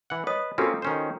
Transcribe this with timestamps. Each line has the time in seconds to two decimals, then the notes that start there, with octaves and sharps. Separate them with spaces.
0.10 E3 F#5
0.27 B4 C#5 D#5 D#6
0.58 A#3 C4 C#4 F4 F#4 A4
0.82 D#3 C#4 C5